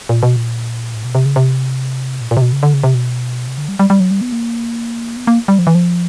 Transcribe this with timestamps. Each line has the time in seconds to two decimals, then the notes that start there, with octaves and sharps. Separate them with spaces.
0.09 A#2
0.23 B2
0.36 A#2
0.94 A2
1.05 B2
1.15 C3
1.25 C#3
1.36 C3
2.21 A#2
2.31 A#2
2.37 C3
2.42 B2
2.53 C#3
2.63 D3
2.74 C#3
2.83 C3
2.94 B2
3.47 C3
3.58 D3
3.68 G3
3.79 G3
3.90 G3
4.00 F#3
4.11 G3
4.21 B3
4.32 A#3
5.16 B3
5.27 A#3
5.48 G3
5.59 F3
5.67 E3
5.75 F3